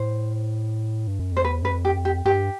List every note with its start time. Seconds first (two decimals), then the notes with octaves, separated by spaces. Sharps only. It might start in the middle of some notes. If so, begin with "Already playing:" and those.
Already playing: A2 C5
1.07 G2
1.19 F#2
1.32 F2 C5
1.44 E2 B4
1.62 F#2 B4
1.71 F2
1.85 G4
1.93 F#2
1.98 F2
2.05 G4
2.25 G2 G4